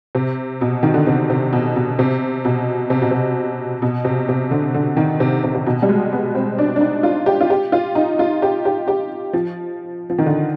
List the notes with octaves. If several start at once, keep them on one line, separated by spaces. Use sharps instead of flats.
C3
B2
D#3
D3
C3
C3
B2
B2
C3
B2
C3
B2
C3
B2
C3
C3
D3
D3
D#3
C3
C3
C3
B2
G3
G#3
B3
C4
D4
D4
D#4
F4
G4
F4
G4
F4
D#4
F4
G4
G4
G4
F3
F3
D#3
D3